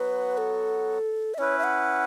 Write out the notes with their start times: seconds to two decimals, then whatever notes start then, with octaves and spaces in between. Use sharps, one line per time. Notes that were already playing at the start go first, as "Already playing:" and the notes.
Already playing: F#3 B3 F#4 B4
0.38 A4
1.34 E5
1.38 C#4 E4 B4 C#5
1.59 E5
1.64 F#5